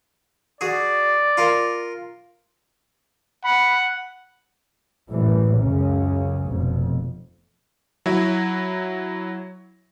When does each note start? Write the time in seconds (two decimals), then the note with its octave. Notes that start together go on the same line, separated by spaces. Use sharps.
0.61 F#4 G#4 D5
1.37 F4 A#4
3.44 F#5 B5
5.09 F#2 A2 E3 G3
5.57 C#2 F#2 C#3 C#4
6.48 F1 F2 B2
8.06 F#3 E4